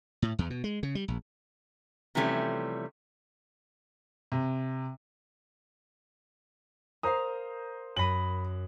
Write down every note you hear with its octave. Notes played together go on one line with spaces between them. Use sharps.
A2
E2
B2
G#3
C#3
G3
A#1
C3 E3 F3 G3 A3 C#4
C3
A#4 C5 F5 A#5 D#6
F#2 B5 A#6 D#7 F#7